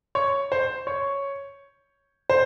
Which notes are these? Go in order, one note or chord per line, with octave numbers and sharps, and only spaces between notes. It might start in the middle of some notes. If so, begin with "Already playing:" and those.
C#5
C5
C#5
C5